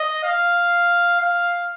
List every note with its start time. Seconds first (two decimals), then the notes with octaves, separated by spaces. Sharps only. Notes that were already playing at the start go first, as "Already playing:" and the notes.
Already playing: D#5
0.24 F5
1.20 F5